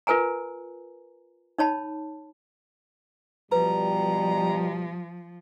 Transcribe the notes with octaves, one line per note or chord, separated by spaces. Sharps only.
F4 A#4 B4 G#5 A#5
D#4 C#5 A5 B5
B2 F3 G3 B4 A#5